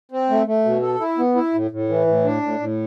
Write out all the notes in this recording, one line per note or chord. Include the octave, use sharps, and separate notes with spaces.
C4
A3
A3
B2
A4
E4
B3
E4
A2
A2
E3
A2
D4
A2
A2